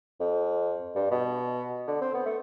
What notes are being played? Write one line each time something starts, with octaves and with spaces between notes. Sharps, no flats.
F2
G2
B2
D3
C4
B3
A3